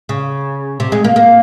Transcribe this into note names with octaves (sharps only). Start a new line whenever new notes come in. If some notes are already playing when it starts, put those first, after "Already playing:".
C#3
C3
G#3
A#3
A#3